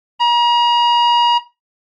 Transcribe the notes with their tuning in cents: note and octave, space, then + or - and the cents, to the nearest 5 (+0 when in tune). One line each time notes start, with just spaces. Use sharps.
A#5 +40